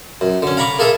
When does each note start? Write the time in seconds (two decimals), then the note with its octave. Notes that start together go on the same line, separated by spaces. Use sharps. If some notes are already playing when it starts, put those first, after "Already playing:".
0.21 F#2
0.42 D3 C#4
0.57 F5 F#5 A#5 B5 C#6 D6
0.79 A#3 G#4 A4 E5 F5